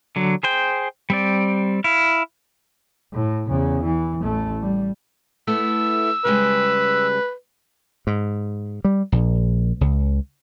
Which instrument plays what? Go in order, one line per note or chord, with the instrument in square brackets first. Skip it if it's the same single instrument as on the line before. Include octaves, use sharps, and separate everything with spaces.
[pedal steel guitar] D3 F#3
G#4 C5 G5
G3 C4 D5
E4 F5
[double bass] A2
E2 C#3
E3
A1 A3
G3
[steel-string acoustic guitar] A3 B3 E4 [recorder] E6
[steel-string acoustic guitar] C#3 G3 G#3 [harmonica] B4
[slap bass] G#2
G3
A#1
C#2